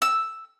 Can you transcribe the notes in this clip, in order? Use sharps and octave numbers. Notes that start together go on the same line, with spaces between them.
E6